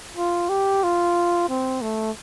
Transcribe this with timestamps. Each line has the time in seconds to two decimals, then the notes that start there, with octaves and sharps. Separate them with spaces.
0.17 F4
0.49 G4
0.83 F4
1.49 C4
1.82 A3